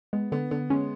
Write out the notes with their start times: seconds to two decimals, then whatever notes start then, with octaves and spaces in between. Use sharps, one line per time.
0.13 G#3 B3
0.32 D3 B3
0.51 D3 B3
0.70 G#3 C#4